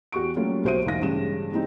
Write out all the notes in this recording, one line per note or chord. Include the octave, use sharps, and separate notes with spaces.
E2 F#4 G4 C#6 D7
F#3 G3 A3 A#3 C#4 F4
B1 F#4 C5 E5 D7 D#7
E1 D#4 F5 A#6
A1 G2 C#3 G3 G#3 E7
C#3 E3 G3 G#3 C4 D#4